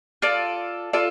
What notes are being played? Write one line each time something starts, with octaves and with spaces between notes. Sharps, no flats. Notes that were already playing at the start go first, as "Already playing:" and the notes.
F4 A4 D5
F4 A4 D5